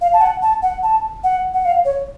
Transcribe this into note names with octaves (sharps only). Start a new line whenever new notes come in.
F5
A5
F#5
A5
F#5
A5
F#5
F#5
F5
C#5